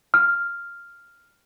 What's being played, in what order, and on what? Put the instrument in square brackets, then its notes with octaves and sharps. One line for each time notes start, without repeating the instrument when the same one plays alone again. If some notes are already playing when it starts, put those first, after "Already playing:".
[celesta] F6